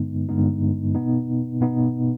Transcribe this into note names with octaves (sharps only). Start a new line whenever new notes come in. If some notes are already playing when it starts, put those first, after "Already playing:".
Already playing: G2 D3 G#3 B3 D#4
G2 D3 G#3 B3 D#4
B2 B3 D#4
B2 B3 D#4